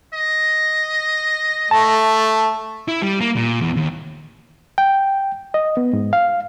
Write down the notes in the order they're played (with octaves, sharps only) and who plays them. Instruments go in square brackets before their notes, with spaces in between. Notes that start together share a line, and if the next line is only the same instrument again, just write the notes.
[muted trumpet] D#5
[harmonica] A3 [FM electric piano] A5
[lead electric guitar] E4
G3
A#3
A#2
E2
D#2
[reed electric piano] G5
D#5
B3
G#2
F5